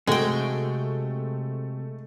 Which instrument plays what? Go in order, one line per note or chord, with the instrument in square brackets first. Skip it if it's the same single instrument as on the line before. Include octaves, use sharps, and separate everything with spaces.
[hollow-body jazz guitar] C3 F#4 [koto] G#3 G5 [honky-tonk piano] A3